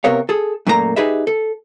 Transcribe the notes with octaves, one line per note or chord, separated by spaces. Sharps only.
C3 B3 A#4 C#5 F5
G#4 A4
F#2 A#2 A3 A#3 A#4 A#5
D#4 G4 G#4 B4 D#5 E5
A4